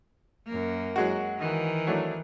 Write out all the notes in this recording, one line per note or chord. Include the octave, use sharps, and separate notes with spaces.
F#2 A#3
F#3 G#3 F#4
D#3 E3
F#3 A3 D4